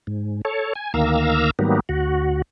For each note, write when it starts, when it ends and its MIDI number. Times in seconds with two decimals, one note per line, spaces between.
0.07 0.41 44
0.45 0.73 69
0.45 0.73 73
0.76 0.93 80
0.94 1.51 38
0.94 1.51 51
0.94 1.51 58
0.94 1.51 77
0.94 1.51 82
0.94 1.51 88
1.59 1.80 44
1.59 1.80 51
1.59 1.80 54
1.59 1.80 55
1.59 1.80 58
1.59 1.80 59
1.89 2.42 38
1.89 2.42 66